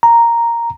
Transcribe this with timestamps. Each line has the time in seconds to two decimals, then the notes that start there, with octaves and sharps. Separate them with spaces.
0.03 A#5